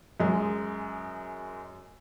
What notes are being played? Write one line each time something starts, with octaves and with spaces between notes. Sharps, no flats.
F#2 G#3